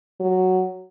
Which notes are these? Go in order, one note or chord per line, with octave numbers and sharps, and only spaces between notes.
F#3